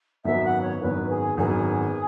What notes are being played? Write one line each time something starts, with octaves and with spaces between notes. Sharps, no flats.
G#1 F#2 F#3 B3 E5
F#5
C#5
G#1 F#2 F#3 B3 B4
G#4
G#1 F#2 F#3 B3 G#4